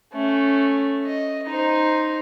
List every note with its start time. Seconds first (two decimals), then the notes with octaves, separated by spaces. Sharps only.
0.14 A3 C#4
1.06 D#5
1.47 D#4 C5